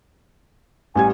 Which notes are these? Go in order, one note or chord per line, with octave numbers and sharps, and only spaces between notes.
A1 G3 G#5 G#6